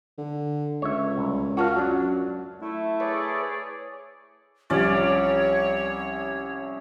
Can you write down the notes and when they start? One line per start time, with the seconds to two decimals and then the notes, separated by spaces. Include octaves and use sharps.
0.18 D3
0.82 C#2 C#5 E5
1.17 C2
1.57 F4 F#4 A#4 F5 A5
1.76 F#2 F#3 D4
2.62 A3 E4
3.00 G#4 B4 C#5 D5
4.70 C2 F3 G3 C#4 C#5 D5